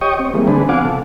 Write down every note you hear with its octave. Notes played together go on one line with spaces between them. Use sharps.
G4 C#5 D#5 G5 C#6 D#6
C4
E3 G3 G#3 A#3
D3 C4 D4 G#4 B4
F3 B3 F5 F#5 G#5 D6
C3 A4